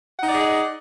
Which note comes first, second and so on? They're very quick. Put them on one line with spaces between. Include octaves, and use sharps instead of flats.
F#5 D#4 D5 D#5 G#4